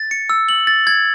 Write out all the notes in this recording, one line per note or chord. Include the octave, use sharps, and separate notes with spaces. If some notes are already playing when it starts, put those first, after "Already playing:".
Already playing: A6
C#7
E6
F#7
A6
G#6